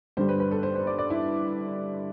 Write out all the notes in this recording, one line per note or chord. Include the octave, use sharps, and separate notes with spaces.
G2 D3 G3 C5
B4
B4
A4
C5
C5
D5
D5
E4